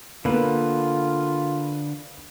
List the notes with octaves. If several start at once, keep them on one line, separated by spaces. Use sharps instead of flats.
D3 A#3 B3 F4 B4